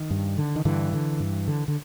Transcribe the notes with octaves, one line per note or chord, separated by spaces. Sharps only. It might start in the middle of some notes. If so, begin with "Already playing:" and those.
Already playing: D#3
G2
D3
D#3
G2 D3 E3
D3
G2
D3
D3